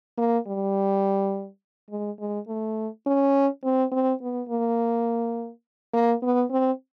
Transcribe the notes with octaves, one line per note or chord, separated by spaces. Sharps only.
A#3
G3
G#3
G#3
A3
C#4
C4
C4
B3
A#3
A#3
B3
C4